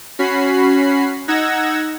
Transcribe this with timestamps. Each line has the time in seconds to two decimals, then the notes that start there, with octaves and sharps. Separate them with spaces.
0.19 C#4 F#4 B5 C7
1.28 D#4 F#5 E6 G#6 A#6